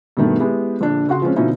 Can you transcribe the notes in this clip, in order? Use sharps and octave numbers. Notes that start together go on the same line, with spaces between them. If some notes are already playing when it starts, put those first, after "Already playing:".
G2 B2 D#3 A3 B3
G#3 B3 E4 G4
A#1 D3 D4
C#3 F#4 F#5 C6
F3 G#3 C4 C#4
B2 D3 F3 C#4 D#4 E4